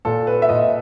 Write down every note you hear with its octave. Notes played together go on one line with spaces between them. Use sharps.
A#2 A4
B4
E5
A#2 D#5